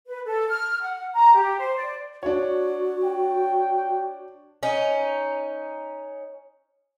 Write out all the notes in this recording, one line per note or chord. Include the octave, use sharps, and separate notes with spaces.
B4
A4
F6
F#5
A#5
G4
C5
D5
D4 F#4 C#5
G5
C#4 D#4